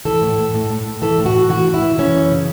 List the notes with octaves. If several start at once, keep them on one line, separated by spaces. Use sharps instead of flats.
E3 A4
A2
A2
A2
A2
A2
E3 A4
A2
F#4
A2
E3 F#4
A2
E4
E3
E3 C#4
F#2
C#3